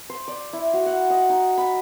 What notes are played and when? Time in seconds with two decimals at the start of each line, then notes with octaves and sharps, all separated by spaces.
0.10 C5
0.28 D5
0.53 E4
0.73 F#4
0.86 F#5
1.10 D#5
1.29 D#4
1.58 B5